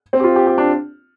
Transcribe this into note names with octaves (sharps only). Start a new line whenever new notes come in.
C4
G4
F4
G4
G4
D4